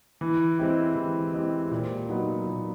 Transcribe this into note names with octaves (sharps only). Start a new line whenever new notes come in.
E3
G#3 C4 E4 G4
E3
G#3 C4 E4 G4
A#2
F#3 B3 D#4
A#2